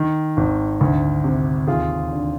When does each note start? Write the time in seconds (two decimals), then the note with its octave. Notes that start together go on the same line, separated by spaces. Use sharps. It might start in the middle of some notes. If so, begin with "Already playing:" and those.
Already playing: D#3
0.37 G#1
0.81 D2
1.24 C3
1.67 D#2 F4 G#4
2.11 D3